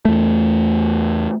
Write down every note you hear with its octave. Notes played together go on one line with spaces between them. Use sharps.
E2 A3